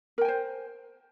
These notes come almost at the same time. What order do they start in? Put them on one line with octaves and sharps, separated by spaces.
A#4 G5 G#5 C5